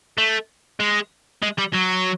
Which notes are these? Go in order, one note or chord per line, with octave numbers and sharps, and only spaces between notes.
A3
G#3
G#3
G3
F#3